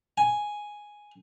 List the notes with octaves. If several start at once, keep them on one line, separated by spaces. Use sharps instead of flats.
G#5